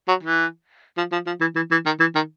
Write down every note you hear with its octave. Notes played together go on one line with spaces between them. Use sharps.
F#3
E3
F3
F3
F3
E3
E3
E3
D#3
E3
D#3